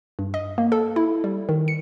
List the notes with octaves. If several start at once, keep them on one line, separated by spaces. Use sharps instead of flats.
G2
D#5
A#3
A4
E4
G3
D#3
C#7